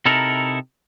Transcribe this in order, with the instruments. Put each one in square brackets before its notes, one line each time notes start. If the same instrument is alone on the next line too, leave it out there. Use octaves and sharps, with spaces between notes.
[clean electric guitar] C3 D#4 E4 A4 A#4